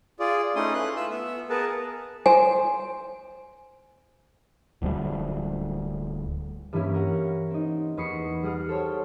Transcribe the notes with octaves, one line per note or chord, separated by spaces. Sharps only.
F4 G#4 D5
A3 C#4 D#4 E4 C6 D#6
A3 B4 C6 F#6
F4 E5 E6
B3 E5
B3 G#4 A#4 B4 A5
C5 G#5
D1 D2 F3 G3
G2 E3 G3 A#3 C#4 E4
A#4 F#5
C4 D#4
E2 B4 C#6 D#6 C7 C#7
G3 G#4 F#5 D#6 F6
A4 C5 C#5 G5